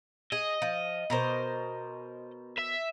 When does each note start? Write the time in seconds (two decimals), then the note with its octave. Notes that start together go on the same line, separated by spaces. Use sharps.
0.32 G#4 D#5
0.62 F3
1.10 B2 A#4 C5
2.58 E5